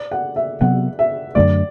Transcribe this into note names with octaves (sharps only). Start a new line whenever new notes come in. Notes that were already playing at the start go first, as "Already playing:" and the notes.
Already playing: D5
F#5
E5
C3 F#3 B3 F#5
E5
F#2 D3 A3 D5